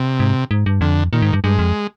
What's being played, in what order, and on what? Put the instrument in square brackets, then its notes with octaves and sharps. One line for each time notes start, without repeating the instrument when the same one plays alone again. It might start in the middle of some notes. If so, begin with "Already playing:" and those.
Already playing: [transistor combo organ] C3
[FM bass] G#2
G#2
G2
[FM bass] F2 [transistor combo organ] D3
[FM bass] A#2 [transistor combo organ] D#3
[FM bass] G#2
G2
[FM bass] G2 [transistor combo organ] G#3
[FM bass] F2